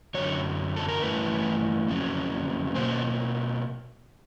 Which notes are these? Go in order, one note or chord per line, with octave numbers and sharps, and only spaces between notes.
F#2 D3 F#3 C#5
A4
A#4
G2 E3 A3 B4
F2 C#3 F#3
B2 F#3 A#3 C5